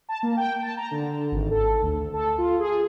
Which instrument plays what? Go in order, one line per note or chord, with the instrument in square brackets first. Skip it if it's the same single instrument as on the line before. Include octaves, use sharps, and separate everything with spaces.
[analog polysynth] A5
A#3
G5
A5
A#5
D3
G#1
A4
D2
A4
F4
G#4